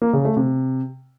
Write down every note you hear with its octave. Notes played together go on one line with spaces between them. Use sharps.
A#3
C#3
A3
C3